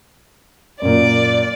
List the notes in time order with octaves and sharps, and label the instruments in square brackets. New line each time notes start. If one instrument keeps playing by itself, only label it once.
[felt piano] F#2 A#2 [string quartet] D5